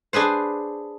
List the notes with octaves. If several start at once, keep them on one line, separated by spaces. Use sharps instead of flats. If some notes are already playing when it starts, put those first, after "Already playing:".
D4 G#4 B4 C5